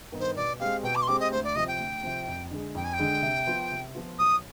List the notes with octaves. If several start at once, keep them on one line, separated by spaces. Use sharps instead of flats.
G2 D#3 B3 D#4
C5
B2 D5
G#3 C4 G4 F5
B2 G5
D6
C6
G#3 C4 G4 D6
D#5
D2 C5
D5
C3 F3 C4 D#5
G5
D2
C3 F3 C4
F2
D3 G#3
F2 G5
G#5
G5
D3 G#3
C3
F3 B3 F4
C3
F3 B3 F4
B1 D#6